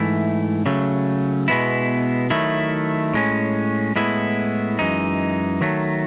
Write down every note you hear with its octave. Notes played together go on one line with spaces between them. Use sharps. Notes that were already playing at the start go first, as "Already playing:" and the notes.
Already playing: G#2 E3 A3 E4
C#3 F#3 A3
B2 G#3 B3 E4
D#3 F#3 A3 E4
A2 G#3 C#4
A2 G#3 B3 E4
F#2 E3 G#3 D#4
D#3 F#3 A3